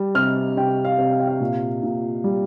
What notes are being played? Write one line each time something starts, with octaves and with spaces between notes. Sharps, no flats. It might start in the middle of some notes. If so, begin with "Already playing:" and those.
Already playing: G3
C3 F6
C3 G5
F5
C3
F5
G5
F5
A#2
A#2
G3